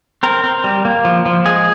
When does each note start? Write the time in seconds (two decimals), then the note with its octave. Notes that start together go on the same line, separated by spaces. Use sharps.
0.23 C4 A#4
0.44 C4
0.64 G3
0.85 A#3
1.05 F3
1.26 F3
1.46 G#3 G#4